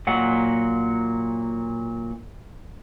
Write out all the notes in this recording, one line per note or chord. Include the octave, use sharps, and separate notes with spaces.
A#2 F#3 F#5